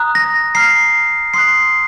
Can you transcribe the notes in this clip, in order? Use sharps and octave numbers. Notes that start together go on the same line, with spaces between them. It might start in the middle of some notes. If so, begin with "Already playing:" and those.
Already playing: A#5 D#6 F#6
A#6
A#5 F6 C7
C6 D#6 F#6 C7